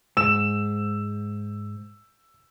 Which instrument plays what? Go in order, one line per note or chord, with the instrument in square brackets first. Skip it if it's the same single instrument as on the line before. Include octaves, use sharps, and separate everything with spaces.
[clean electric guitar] G#2 [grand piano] E6 E7